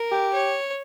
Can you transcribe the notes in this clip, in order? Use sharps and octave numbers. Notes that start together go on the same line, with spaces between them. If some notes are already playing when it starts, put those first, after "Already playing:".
Already playing: A#4
G4
C#5